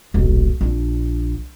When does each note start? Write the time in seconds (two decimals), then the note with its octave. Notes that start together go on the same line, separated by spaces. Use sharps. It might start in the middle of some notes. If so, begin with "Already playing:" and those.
0.14 D#1 B1
0.61 A#1 D4